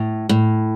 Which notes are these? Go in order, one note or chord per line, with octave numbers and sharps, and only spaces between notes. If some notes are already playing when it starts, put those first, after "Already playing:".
Already playing: A2
A2